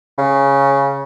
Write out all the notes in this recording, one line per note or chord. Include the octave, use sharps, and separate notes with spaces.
C#3